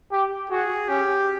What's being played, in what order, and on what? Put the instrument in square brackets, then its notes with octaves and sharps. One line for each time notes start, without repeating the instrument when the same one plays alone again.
[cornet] G4
[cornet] F#4 [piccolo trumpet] G#4
[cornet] C#4 [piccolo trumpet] G4